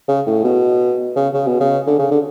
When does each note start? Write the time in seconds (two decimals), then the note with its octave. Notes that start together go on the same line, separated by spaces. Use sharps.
0.08 C#3
0.27 A2
0.44 B2
1.16 C#3
1.34 C#3
1.47 B2
1.60 C#3
1.87 D3
1.99 C#3
2.11 D3